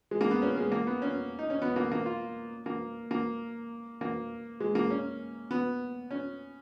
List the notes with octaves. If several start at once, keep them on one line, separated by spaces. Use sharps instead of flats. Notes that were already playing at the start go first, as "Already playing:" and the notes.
G#3
A#3
B3
C#4
G#3
A#3
B3
C#4
D#4
C#4
B3
A#3
A#3
F4
A#3
A#3
A#3
G#3
A#3
C#4
B3
C#4